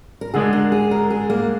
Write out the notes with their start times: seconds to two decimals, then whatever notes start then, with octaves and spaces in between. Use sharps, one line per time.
0.21 A#4
0.34 D3 G#3 D4 G#4
0.53 A#4
0.72 G#4
0.91 A#4
1.10 G#4
1.30 A#3